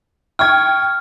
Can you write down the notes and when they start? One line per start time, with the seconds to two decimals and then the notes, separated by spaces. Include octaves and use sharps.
0.39 G5 C#6 F6 G#6